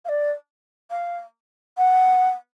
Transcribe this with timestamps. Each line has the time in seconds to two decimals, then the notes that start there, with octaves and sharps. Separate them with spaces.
0.05 F5
0.08 D5
0.91 F5
1.77 F#5